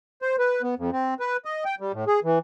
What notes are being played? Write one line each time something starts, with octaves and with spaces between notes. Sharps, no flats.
C5
B4
B3
F2
C4
B4
D#5
G5
G3
A2
G#4
E3